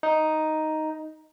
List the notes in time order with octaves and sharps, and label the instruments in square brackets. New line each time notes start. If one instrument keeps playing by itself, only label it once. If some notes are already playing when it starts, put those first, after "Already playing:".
[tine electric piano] D#4